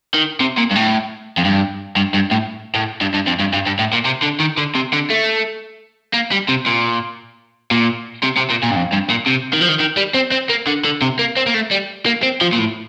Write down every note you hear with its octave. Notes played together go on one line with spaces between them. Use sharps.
D#3
C3
A#2
G2
A2
F2
G2
G2
G2
A2
A2
G2
G2
F2
G2
G2
G2
A2
A#2
C3
D3
D#3
D3
C3
D3
A3
A#3
G3
C3
A#2
A#2
C3
C3
A#2
A#2
G2
F2
G2
A#2
C3
D#3
F3
D#3
D#3
G3
C4
C4
A#3
D3
D3
C3
A#3
C4
A#3
A3
G3
A#3
C4
F3
A#2
A2